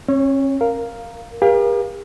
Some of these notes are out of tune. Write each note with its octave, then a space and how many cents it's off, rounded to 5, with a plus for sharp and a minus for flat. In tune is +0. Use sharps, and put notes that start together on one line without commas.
C#4 -40 C#5 +0
A#4 +0 F5 +0
G4 +45 A#4 +40 F5 +0